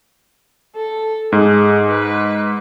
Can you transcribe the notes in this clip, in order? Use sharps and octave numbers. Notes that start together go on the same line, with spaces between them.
A4
G#2 G#4
B4